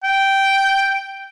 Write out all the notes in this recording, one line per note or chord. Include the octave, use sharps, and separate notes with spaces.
G5